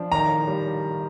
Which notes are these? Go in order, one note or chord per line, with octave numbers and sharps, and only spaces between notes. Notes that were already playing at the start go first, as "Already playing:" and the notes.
Already playing: F3 D4
D#3 A#5
G3